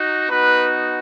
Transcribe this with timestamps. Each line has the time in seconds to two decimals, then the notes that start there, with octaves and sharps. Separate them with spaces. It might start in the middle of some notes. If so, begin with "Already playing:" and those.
Already playing: D#4 F#4
0.28 B3 D#4 F#4 B4